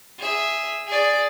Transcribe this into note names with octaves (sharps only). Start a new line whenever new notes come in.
G#4 E5
G#4 D5